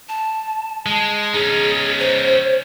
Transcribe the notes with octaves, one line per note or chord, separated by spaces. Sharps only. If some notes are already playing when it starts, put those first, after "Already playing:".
A5
G#3 A5
C#4 D#4 G#4
C5